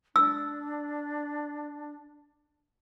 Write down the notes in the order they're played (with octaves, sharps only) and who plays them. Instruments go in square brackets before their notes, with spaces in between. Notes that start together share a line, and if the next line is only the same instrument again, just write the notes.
[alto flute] D4 [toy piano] E6